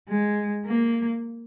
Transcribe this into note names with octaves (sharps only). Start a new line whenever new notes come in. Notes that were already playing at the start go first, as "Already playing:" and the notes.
G#3
A#3